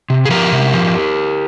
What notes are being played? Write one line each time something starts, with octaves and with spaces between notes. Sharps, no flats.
C3
G#4
F3 G4 A#4
C3
F3